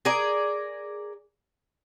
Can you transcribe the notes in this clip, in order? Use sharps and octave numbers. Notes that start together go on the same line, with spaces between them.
G#4 A#4 D5